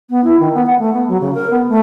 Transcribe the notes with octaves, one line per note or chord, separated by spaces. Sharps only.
B3
E4
D#3
B3
F#5
A3
B3
F#3
C#3
A#4
B3
A3